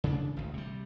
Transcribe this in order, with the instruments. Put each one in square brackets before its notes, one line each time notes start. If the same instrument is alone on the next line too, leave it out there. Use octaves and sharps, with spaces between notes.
[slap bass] C#3 D4
G#1 D2
C3 G3